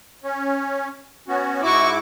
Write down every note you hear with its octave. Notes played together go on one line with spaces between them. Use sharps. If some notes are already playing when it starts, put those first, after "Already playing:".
C#4
B3 C#4 F#4
G#2 E4 F#4 C#6 D6